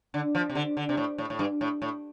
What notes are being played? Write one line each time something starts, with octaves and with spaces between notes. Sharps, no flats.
D3
F3
C3
D3
D3
C3
A2
A2
A2
G2
A2
A2